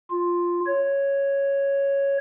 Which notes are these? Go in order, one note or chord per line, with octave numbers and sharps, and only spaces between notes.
F4
C#5